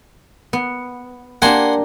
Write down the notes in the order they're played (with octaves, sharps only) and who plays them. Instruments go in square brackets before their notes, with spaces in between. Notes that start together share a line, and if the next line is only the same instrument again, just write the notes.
[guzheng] B3
[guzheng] A#3 D4 G4 [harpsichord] F#5 G#5 C6